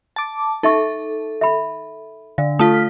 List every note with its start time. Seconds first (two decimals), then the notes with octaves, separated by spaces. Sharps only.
0.16 A5 D6
0.63 D#4 A4 E5 C#6
1.41 E5 B5
2.38 D3 F5
2.59 A3 F4 D#6 B6